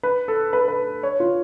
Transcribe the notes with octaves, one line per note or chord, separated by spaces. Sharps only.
B4
A4
B4
A4
B4
C#5
F4